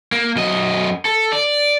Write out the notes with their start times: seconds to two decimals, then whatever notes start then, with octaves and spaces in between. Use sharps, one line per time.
0.12 A#3
0.36 F#2 D#5
1.05 A4
1.32 D5